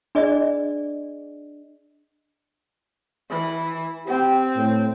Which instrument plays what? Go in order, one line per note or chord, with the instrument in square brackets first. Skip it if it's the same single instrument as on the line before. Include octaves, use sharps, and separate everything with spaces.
[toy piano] D4 G#4 D5 D#5
[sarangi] E3
[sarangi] C4 [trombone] G4
[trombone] A2